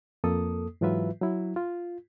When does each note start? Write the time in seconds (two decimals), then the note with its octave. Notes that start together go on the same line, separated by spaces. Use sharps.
0.24 F2 A#3 A4 D#6
0.81 G#2 E3 F#3 F4 B4 E5
1.21 F#3 E4
1.56 F4